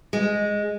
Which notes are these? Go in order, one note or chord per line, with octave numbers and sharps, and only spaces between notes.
G#3